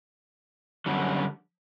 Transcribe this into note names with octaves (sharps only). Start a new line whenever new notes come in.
F#2 D3 G3